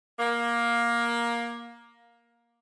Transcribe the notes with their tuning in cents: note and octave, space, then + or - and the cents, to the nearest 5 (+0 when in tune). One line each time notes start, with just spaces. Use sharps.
A#3 +15